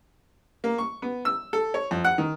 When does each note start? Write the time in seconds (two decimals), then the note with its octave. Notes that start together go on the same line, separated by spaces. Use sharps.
0.64 A#3
0.78 C#6
1.02 B3
1.25 E6
1.53 A4
1.74 C#5
1.91 F2
2.05 F#5
2.18 D#3